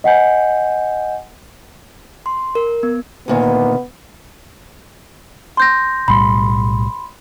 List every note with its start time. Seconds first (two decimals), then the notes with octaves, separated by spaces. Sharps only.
0.04 D#5 F#5 G#5 G6
2.26 C6
2.55 A#4
2.83 B3
3.28 D2 A#2 D#3 B3
5.57 C6 G6 A#6
6.08 B1 A2 G3 B5 C6